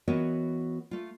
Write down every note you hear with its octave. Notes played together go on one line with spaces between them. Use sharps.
E3 B3 F#4 A#4 C#5 D#5
A3 F4